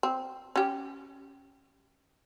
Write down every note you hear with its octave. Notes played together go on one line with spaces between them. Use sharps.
C4
C#4 G4